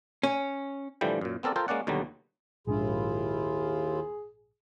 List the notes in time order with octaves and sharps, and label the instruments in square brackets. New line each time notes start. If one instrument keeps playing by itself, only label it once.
[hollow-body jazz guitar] C#4
[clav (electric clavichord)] A2 D3 E3 F3 G3 G5
F#2 A#2
B3 C4 A4 A#4 D5
F4 A4 A#4 C5 F5 G5
G#3 A#3 C#4 D5 F#5
D#2 B2 D3 F#3 G3
[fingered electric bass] A#1 G#2 D4 [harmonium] D#2 E4 F4 [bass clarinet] G#4